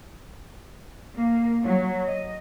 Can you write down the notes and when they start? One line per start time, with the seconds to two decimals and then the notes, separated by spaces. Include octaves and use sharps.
1.16 A#3
1.63 F#3
2.07 D#5